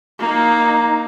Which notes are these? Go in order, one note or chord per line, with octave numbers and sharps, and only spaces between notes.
A#3 D#4